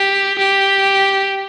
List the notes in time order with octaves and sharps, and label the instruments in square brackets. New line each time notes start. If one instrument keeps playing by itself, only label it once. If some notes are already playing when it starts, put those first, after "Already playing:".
Already playing: [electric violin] G4
G4